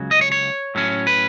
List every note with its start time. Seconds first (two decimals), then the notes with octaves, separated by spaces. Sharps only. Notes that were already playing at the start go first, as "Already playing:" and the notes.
Already playing: C#2 C#3 F#3
0.11 D#5
0.21 C#5
0.32 C#5
0.75 A2 F#3 C#4
1.07 B4